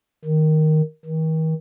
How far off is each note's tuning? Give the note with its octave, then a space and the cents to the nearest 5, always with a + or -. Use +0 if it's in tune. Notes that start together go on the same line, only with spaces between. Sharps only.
D#3 +0
D#3 +40